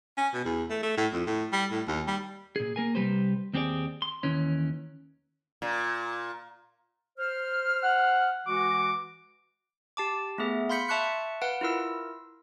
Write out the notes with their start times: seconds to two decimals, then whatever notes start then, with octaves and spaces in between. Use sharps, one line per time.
0.17 C#4
0.33 B2
0.45 E2
0.70 A3
0.83 A3
0.97 A2
1.13 F2
1.26 A2
1.52 G3
1.71 A2
1.88 D#2
2.07 G3
2.56 A#2 G#4
2.76 A#3 A#4 G#5
2.95 C2 G3 G4 B4 C5
3.54 D#2 C4 G4 G#4 D5
4.02 C6
4.23 D#2 D#3 E3 C#4
5.62 A#2
7.18 C5 F6
7.84 F#5
8.47 E3 G#3 F#4 D6
9.97 G4 A5 D6
10.38 A3 B3 G#4 E5
10.69 F5 B5 C6 G6 B6 C#7
10.88 E5 A5 C#6 F#6 C#7
11.42 B4 F5 F#5 D7
11.61 E4 F4 A#4 E6